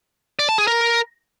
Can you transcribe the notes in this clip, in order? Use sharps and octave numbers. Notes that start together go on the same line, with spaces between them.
D5
A5
G#4
A#4